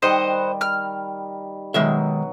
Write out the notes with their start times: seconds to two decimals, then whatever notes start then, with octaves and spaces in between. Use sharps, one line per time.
0.02 D#3 G3 D#4 C5 D#5 F#5
0.61 F6
1.74 B2 D#3 F#3 G#3 E5